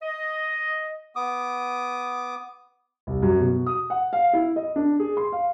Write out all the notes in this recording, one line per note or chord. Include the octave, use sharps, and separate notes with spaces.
D#5
B3 D6 D#6
C2
F#2
B2
D#6
F#5
F5
E4
D#5
D4
G#4
C6
F5